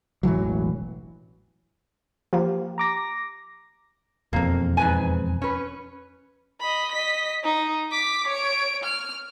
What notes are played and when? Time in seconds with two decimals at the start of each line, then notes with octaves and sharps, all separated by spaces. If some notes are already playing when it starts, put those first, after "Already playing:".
0.23 E1 A1 E3 F#3
2.33 F3 A#3 G4
2.78 A#5 D6 A#6
4.33 E1 F2 A#3
4.77 G#2 B4 G#5
5.42 C#4 B4
6.60 D#5 B5
6.92 D#5 B6
7.44 D#4
7.91 D6 B6
8.28 C#5 D7
8.84 F6